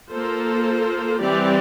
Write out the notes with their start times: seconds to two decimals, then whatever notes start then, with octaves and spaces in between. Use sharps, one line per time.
0.11 A#3 F4 A4 C5
1.20 E3 G3 C4 G4 D5